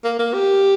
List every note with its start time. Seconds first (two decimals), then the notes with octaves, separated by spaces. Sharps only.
0.04 A#3
0.19 A#3
0.34 G4